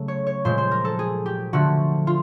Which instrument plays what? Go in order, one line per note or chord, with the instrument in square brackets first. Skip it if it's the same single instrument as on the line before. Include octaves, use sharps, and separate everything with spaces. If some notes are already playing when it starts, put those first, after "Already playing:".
Already playing: [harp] C#3 F#3 A3 A4
C#5
C#5
A#2 F3 G#3 C5
C5
A#4
A4
G#4
G4
D3 F3 A3 F#4
F4